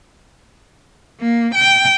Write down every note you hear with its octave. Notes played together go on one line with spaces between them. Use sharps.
A#3
G5